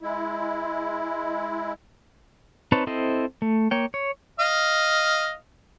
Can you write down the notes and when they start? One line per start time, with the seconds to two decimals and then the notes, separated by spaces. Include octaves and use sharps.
0.02 G#3 E4
2.72 C4 D#4 B4 C#5 A5
2.87 C4 E4 A4 C5 D#5
3.42 A3
3.71 A#3 C#5 G5
3.94 C#5
4.40 D#5 F5